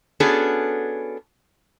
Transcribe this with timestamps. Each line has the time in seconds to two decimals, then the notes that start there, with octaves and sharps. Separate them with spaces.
0.20 B3 C#4 D4 F#4 G#4 A4